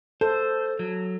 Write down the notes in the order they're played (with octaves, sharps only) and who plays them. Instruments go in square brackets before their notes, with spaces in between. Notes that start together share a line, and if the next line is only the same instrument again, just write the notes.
[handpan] A4 [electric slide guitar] C5
[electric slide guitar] F#3